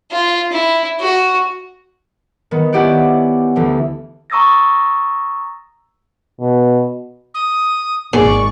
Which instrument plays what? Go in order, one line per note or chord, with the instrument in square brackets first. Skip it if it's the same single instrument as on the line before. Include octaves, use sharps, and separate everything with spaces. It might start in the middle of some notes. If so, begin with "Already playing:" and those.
[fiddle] F4
E4
F#4
[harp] D#3 B3
B3 C#4 E4 G4 D5 F#5
D2 D3 E3
[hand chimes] A#5 C#6 D#6 E6 A6 A#6
[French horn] B2
[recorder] D#6
[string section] G#1 C#6 [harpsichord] A#2 [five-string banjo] G#4 [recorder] D5